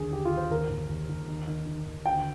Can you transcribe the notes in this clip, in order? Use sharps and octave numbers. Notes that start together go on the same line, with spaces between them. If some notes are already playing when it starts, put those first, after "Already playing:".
Already playing: D#2 D3 G#4
D#2 G4
F4
D#2
C5
D#2 A#4
D#2
D#2
D#2
D#3
D#3
D#3
D#2
D2 G5